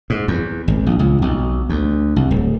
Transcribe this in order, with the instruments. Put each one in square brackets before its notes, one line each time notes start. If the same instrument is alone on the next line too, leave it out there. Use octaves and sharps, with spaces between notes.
[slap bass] G#2
E2
G#1
A#1
C#2
B1
D2
C2
D1